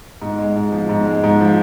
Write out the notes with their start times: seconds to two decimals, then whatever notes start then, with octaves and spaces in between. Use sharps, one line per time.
0.22 G#2
0.39 G#3
0.56 G#2
0.72 F3
0.89 G#2
1.06 G#3
1.24 G#2
1.40 F3